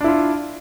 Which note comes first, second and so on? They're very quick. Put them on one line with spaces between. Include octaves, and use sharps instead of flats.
D4 E4 F4